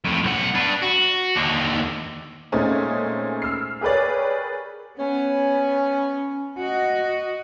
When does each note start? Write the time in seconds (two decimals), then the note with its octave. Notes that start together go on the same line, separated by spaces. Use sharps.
0.05 F2 A2
0.23 B1 F#5
0.54 D4 B4
0.82 F#4
1.36 D#2 D3
2.52 A#2 G#3 A3 C4 C#4 D#4
3.42 E6 F6 C7
3.81 G4 G#4 A#4 B4 C#5 D5
4.99 B3 C#4
6.58 F#4 D#5